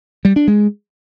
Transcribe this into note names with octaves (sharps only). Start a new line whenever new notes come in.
G3
D4
G#3